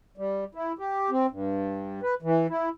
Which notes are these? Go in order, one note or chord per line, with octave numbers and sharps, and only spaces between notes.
G3
E4
G4
C4
G2
B4
E3
E4